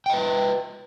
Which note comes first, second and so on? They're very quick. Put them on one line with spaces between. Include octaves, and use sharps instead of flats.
G5 D#5 B4